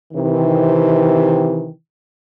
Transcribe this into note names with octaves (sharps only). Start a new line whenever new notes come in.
C3 D#3 E3